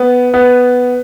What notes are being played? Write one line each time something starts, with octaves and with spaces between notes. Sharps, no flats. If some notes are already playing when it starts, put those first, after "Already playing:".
Already playing: B3
B3